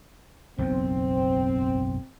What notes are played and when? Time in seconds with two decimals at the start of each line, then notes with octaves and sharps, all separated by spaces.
0.58 F#1 B1 E2 C4